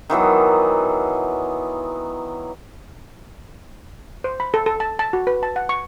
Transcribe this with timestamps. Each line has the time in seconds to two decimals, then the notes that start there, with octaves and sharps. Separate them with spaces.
0.10 D#3 E3 F#3 B3
4.24 C5
4.40 B5
4.54 A4
4.66 A4
4.80 A5
4.99 A5
5.13 F#4
5.27 B4
5.43 A5
5.56 F#5
5.69 C#6